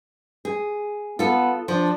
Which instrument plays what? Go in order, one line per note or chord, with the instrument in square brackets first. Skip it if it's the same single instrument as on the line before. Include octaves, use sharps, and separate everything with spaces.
[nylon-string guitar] G#4
[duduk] B3 [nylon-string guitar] F4 A4
[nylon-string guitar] F3 [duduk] D4